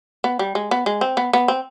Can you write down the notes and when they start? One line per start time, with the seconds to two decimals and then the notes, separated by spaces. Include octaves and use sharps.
0.24 B3
0.39 G3
0.55 G#3
0.71 B3
0.86 G#3
1.01 C4
1.17 B3
1.33 B3
1.48 C4